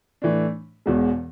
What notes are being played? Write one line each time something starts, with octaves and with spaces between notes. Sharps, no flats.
A2 E3 A3 D4
E1 E2 B2 G#3